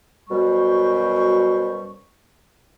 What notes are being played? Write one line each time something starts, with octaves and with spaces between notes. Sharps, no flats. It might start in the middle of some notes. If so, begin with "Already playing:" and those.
F#2 B2 G3 C5 C#6